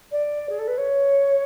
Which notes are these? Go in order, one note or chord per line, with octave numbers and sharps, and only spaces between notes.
D5
G#4
A4
B4
C#5